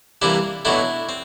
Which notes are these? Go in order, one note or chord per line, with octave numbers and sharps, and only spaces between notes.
C3 E3 G3 A#3 D4 E4
B2 F#3 A3 D4 E4
C4